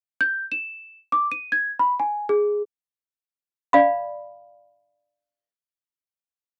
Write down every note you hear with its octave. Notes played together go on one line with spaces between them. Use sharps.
G6
E7
D6
D#7
G#6
B5
G#5
G#4
D5 F5 B5